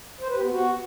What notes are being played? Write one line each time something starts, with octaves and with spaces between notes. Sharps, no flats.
C5
B4
G4
B3
F#4